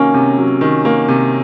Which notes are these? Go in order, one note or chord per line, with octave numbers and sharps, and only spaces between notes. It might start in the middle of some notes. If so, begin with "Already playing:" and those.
Already playing: C3 D#3 F#3 A#3 C#4
C3
F#3
D#3
A#3
C3